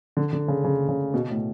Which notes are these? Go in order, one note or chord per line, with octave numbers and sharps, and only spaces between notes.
D3
D3
C#3
C#3
C#3
B2
A2